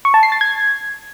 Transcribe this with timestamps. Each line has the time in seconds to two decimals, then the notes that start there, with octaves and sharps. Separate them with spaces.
0.05 C#6
0.14 A5
0.23 C7
0.32 A6
0.41 G#6